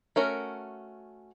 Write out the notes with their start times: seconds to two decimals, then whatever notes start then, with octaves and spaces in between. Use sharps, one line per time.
0.16 A3 C#4 F#4 A#4